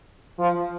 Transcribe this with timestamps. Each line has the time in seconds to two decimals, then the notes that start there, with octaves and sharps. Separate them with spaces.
0.39 F3